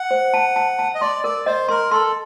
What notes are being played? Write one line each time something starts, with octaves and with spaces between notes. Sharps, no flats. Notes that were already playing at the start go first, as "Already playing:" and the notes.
Already playing: F#5
C5
A5
A5
A5
D#5
D5 C6
A#4 D5
C5 D#5
A#4 C6
A4 C6